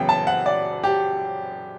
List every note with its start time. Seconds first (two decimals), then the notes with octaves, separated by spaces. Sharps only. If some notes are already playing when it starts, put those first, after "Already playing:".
Already playing: F#2 C#3 E3 B3 G5
0.09 A5
0.27 F#5
0.46 D5
0.84 G4